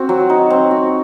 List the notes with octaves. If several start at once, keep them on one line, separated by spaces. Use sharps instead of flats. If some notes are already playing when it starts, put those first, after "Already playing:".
Already playing: C4 F#4
F#3
D#4
C4
F#4